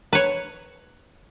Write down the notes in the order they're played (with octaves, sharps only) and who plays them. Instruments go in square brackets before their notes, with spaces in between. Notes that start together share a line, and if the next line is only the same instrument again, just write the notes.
[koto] B4 C#5